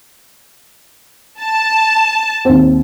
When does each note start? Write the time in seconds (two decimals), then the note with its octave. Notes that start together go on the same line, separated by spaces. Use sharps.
1.40 A5
2.45 D#2 C4